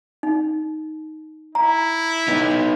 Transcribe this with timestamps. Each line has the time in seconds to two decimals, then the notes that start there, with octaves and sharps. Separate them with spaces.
0.23 D#4
1.55 E4 A#5
2.28 B3 D#4